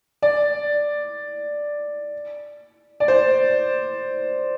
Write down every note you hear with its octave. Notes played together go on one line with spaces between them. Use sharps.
D5
D5
C5